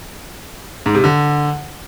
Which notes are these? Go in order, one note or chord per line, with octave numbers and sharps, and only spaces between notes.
G#2
C3
D3